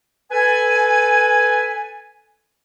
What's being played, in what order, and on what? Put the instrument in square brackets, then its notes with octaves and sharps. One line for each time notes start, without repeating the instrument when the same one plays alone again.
[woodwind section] A4 B4 G#5